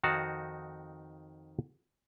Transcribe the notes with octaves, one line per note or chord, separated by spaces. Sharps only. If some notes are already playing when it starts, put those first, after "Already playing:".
F2 D#3 D#4 F#4 F5 A5